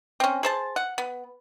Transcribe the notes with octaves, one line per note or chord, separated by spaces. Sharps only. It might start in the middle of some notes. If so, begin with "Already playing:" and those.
C4 C#4
G#4 C5 A5
F#5
B3